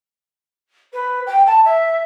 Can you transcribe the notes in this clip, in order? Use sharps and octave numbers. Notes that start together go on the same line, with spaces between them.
B4
G5
A5
E5